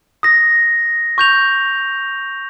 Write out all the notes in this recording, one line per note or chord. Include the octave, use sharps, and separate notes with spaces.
D#6 A#6
C#6 G6 F7